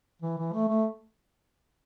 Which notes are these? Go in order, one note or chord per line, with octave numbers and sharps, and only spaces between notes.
E3
E3
A3
A3